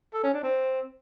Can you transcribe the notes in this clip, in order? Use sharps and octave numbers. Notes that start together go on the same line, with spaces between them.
A4
C#4
D4
C4